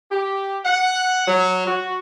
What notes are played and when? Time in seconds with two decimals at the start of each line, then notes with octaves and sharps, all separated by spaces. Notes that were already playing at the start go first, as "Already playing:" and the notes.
0.11 G4
0.64 F#5
1.26 F#3
1.66 F#4